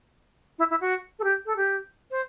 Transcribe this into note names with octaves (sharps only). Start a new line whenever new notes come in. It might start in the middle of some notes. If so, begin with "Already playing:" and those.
E4
E4
F#4
A4
G4
A4
G4
C5